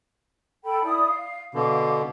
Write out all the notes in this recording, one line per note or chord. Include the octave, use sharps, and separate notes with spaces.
A4 G5 B5
E4 D5 D#6
F5
B2 D3 F5 D6